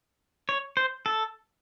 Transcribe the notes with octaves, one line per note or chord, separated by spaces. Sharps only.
C#5
C5
A4